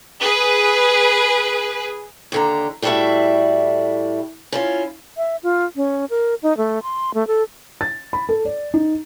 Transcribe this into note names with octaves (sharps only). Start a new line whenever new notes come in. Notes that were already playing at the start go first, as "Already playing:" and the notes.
G#4 B4
D#2 D3 A#5
A2 G3 A3 E4 F#4 E5
C#4 E4 F4
E5
F4
C#4
A#4
D#4
A3
C6
A3
A4
A6
B5
A4
D5
D#4